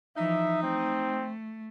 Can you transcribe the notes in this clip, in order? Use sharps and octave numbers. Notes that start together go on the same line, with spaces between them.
E3 F3 D#4 E5
A3 C4